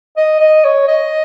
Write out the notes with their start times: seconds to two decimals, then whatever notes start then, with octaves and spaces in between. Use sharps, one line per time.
0.17 D#5
0.40 D#5
0.64 C#5
0.88 D#5